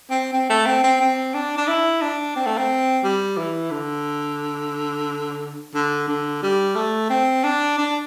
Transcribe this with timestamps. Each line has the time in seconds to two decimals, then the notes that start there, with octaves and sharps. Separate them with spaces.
0.10 C4
0.33 C4
0.50 A3
0.66 C4
0.83 C4
1.00 C4
1.34 D4
1.57 D4
1.68 E4
2.02 D4
2.36 C4
2.47 A3
2.58 C4
3.04 G3
3.37 E3
3.71 D3
5.74 D3
6.08 D3
6.42 G3
6.75 A3
7.10 C4
7.44 D4
7.78 D4